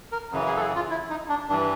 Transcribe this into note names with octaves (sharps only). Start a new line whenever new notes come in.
A#4
F#2 C#3 E3
G#4
A4
G#4
F4
E4
D#4
D4
G2 E3 D4